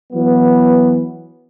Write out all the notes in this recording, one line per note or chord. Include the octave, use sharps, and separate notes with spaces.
E3 F#3 B3